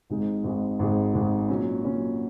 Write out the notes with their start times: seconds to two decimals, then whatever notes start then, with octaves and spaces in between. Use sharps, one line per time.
0.10 G#1 G#2 G#3
0.44 G#1 G#2 G#3
0.79 G#1 G#2 G#3
1.13 G#1 G#2 G#3
1.48 A#2 F#3 C#4
1.84 A#2 F#3 C#4